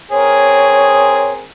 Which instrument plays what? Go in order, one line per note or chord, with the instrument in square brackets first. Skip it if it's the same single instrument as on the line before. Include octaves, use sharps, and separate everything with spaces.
[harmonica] C4 G#4 A#4 [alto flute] C#5